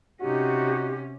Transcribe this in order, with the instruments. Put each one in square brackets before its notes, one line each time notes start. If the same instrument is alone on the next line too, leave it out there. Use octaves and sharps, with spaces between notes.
[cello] C3 C#4 [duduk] D#4 [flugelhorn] F#4 [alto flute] G4